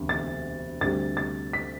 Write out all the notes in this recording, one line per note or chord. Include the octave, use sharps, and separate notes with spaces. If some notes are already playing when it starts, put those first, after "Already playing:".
Already playing: E1 D2 C3
A6
D2 C3 G3 A6
A6
B6